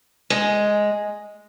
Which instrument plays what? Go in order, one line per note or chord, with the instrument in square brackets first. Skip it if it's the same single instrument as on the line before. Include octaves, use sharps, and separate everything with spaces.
[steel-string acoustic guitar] G#3